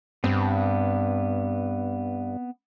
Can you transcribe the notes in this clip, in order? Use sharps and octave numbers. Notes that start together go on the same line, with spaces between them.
G2 B3 C4